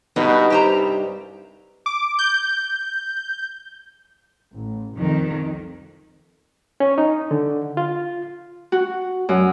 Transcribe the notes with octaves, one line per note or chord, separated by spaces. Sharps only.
G2 B2 G3 B3 D#4 B4
C2 G4 C5 A#5
D6
G6
A1
C2 F2 D#3
C#4
D#4
D3
F4
F#4
F#2